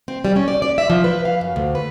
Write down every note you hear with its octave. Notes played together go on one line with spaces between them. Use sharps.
C4
G3
C#4
D5
D5
E5
F3
B4
F5
F#2
D2
B4